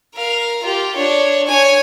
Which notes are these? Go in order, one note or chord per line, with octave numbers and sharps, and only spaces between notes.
A#4 F5
F4 G4
D4 C#5
C#5 G#5